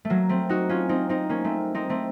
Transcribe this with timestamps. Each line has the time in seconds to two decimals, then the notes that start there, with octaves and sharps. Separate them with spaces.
0.05 A3
0.10 F#3 A#3
0.29 A3 C4
0.49 D#4 F#4
0.69 C#4 F4
0.89 C4 D#4
1.09 C4 D#4
1.29 A#3 C#4
1.44 A3 C4
1.75 C4 D#4
1.90 A3 C4